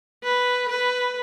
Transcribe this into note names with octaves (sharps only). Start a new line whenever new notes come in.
B4
B4